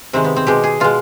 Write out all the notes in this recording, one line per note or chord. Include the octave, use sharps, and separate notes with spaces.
C3 D#3 G#3 C4
B3
C4
B2 G#3 G4
G#4
B2 G#3 F4